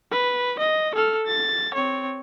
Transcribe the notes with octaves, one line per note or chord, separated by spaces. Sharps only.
B4
D#5
A4 F6
A6
C4 C#5